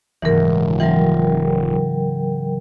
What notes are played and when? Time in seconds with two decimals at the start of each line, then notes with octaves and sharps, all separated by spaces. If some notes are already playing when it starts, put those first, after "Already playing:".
0.22 D#1 G#2 C#3 E3 F#3 A#4
0.80 E3 F#3 F4 A#4 G5